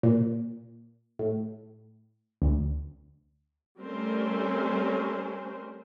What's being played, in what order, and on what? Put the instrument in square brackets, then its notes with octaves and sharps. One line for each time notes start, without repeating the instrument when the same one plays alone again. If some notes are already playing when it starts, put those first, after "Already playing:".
[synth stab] A#2
A2
D2
[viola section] G3 A3 C4 C#4 A#4 C5